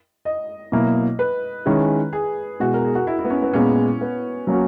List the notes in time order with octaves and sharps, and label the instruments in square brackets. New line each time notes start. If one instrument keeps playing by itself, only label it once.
[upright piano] D#5
[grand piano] B2 F#3 A#3 E4
[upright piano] B4
[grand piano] D#3 G#3 C#4 E4
[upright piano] G#4
[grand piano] B2 G#3 B3 E4 [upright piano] F#4
[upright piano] A#4
G#4
F#4
E4
E4
B3
C#4
B3
[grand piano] A#2 G#3 B3 [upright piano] C#4
[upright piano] B3
[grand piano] F#3 A#3 C#4 F#4